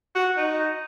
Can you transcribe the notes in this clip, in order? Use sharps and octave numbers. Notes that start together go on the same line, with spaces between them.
F#4
D#4